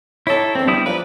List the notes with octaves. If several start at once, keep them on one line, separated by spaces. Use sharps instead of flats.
D#4 E4 G4 A4 C#5
E2 D3 C4
G3 E4 D#6
F3 G3 A#3 B4